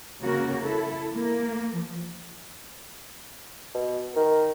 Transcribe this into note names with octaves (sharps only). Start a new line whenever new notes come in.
C#3 A#3 F#4 A#4
E4 A4
A#3
F3
B2
D#3 A#4